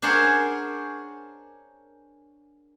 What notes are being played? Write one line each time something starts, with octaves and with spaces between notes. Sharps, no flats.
D4 G#4 A#4 C5 C#5 F#5